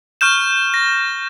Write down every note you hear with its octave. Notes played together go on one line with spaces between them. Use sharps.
C#6 F6 G6 E7
A#6